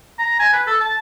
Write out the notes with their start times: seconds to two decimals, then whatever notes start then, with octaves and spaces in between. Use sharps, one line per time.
0.19 A#5
0.39 G#5
0.53 B4
0.67 A4
0.80 A5